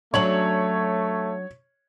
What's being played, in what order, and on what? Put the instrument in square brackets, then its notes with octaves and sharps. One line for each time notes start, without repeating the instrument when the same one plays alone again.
[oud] F#3 C#4 D4 [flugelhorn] A3 [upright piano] C#5 F#7